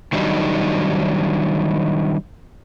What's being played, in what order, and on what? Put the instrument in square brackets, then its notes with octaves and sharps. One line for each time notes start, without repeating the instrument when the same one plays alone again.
[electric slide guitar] D#3 F#3 G3 D4 D#4